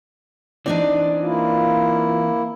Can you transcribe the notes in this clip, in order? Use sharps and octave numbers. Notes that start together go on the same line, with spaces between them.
E3 C4 D4 D#4 D5
A#3 E4 F4